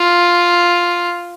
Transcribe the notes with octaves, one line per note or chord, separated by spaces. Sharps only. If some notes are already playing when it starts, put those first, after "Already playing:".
Already playing: F4